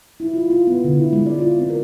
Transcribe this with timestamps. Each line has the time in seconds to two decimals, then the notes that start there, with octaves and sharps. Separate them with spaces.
0.20 E4
0.34 F4
0.50 F4
0.67 B3
0.85 D3
0.98 E4
1.13 G#3
1.26 D5
1.39 F4
1.59 C4
1.70 A#4